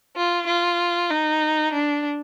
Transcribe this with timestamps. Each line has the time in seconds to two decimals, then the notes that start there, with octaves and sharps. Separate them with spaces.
0.16 F4
0.47 F4
1.10 D#4
1.73 D4